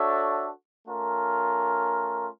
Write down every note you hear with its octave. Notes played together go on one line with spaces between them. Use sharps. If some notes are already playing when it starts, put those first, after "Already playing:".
Already playing: D4 F#4 A4 C#5 E5
A3 C#4 F4 A#4